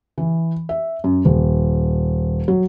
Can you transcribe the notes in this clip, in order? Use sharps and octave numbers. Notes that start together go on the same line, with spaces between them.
E3
E5
F#2
D#1
F#3